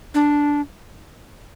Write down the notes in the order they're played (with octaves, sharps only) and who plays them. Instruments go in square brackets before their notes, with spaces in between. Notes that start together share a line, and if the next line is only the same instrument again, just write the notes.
[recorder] D4